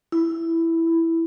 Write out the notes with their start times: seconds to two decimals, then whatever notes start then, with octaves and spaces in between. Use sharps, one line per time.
0.12 E4